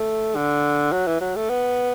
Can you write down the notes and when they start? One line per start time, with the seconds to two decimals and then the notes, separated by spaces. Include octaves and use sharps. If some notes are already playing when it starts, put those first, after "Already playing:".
Already playing: A3
0.35 D3
0.92 F#3
1.07 E3
1.21 F#3
1.35 A3
1.49 B3